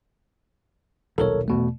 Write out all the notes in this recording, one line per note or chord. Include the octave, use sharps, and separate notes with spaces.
D#1 B1 A4 A#4 C#5
E2 B2 A3